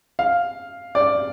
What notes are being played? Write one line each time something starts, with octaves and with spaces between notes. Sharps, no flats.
F5
D5